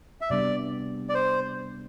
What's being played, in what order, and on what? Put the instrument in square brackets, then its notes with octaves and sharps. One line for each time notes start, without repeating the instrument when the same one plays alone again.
[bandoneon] E5
[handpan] C3 G3 B3 D4 [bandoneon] D5
[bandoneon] D5
C5